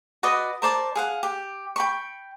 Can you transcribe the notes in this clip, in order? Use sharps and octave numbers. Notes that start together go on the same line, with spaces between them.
F#4 B4 D5 D#5
A#4 C5 D5 A5
G#4 F5 F#5
G4
G5 B5 C#6